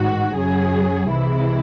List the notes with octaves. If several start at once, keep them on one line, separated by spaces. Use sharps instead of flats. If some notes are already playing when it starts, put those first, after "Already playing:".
Already playing: A1 G#2 D#3 F#4
F#2 C#3 F#3 G#4
C2 C3 E3 G#3 E4